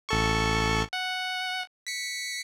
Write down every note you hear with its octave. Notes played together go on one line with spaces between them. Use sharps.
A1 A4 C#6
F#5
B6 C#7